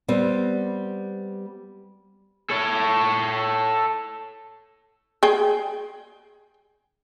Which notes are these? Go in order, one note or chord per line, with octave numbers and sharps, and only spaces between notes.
G3 B3 C4
A4 C#5
G#4 G5